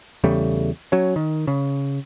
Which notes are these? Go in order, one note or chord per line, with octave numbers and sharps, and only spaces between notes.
E2 C#3 G3 A3
F#3 C#4
D#3
C#3